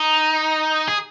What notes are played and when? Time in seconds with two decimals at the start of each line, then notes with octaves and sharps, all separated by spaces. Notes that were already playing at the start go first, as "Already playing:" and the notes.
Already playing: D#4
0.88 G#4